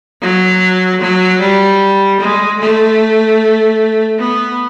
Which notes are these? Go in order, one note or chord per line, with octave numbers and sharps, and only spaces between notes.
F#3
F#3
G3
G#3
A3
B3